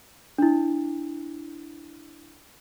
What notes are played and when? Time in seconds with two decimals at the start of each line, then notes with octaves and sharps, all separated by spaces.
0.38 D4 E4